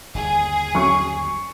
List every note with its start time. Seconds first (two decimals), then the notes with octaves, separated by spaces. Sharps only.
0.14 G1 D#2 G#4
0.75 F#3 C4 C#4 C#6